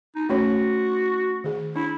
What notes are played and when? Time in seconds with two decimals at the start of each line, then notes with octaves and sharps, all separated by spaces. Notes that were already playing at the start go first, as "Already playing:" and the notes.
0.15 D#4
0.29 A3 C#4 F#4 C#5
1.44 D#3 G#4
1.76 D4 E4